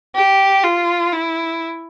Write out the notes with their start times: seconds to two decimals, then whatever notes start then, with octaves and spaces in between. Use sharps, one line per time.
0.16 G4
0.64 F4
1.13 E4